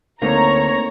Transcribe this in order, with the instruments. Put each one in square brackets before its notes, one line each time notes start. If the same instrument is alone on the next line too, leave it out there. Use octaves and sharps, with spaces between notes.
[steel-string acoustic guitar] D2 [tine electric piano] A#3 C4 D#4 [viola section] C#5 [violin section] A#5